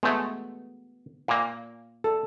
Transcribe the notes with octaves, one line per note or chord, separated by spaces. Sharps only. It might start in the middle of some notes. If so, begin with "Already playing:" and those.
G#3 A3 B3
A#2 A#3
A4